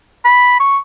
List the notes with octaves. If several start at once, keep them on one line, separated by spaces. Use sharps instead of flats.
B5
C#6